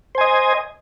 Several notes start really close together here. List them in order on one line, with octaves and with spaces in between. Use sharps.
C5 G#5 D#5